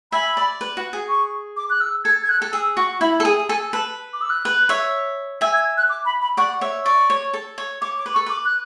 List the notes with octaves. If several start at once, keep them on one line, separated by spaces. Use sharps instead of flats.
E5 G#5 B5
D5
B4
F#4
G#4
C#6
D6
F#6
E6
A4 G#6
G#6
F#6
A4
G#4 E6
F#4 C#6
E4 B5
A4
G#4 G#5
A4 G#5
B4 A5
D6
E6
F#6
B4
C#5 E5
E5 G#5 E6
G#6
F#6
D6
B5
B5
D5 F#5 C#6
C#5 E5
D5 C#6
C#5
A4
C#5
C#5 D6
D6
B4
A4 C#6
B4 D6
F#6